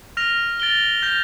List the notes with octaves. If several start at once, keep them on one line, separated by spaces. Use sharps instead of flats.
F6 A#6 F7
A6 D7 G7
G6 A#6 F7